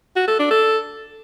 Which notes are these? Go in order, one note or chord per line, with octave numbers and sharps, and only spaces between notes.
F#4
A4
D4
A4